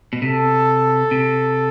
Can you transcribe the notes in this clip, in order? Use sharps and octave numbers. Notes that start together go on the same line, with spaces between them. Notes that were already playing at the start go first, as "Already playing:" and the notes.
B2
C3 A4
C3